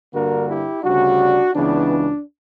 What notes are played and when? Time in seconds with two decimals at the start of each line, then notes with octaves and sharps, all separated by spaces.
0.12 G2 D3 G3 A#3 F#4 A#4
0.48 E4 G4
0.83 D2 C#3 G3 D4 F#4
1.53 C#2 C#3 E3 B3 D4